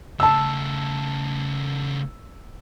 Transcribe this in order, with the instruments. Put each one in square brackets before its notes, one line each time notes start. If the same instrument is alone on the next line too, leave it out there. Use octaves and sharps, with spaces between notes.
[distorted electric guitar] C#3 A3 [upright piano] A5 E6